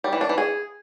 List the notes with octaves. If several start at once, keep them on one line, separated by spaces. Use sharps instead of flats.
G3
E3
D4
E3
G#4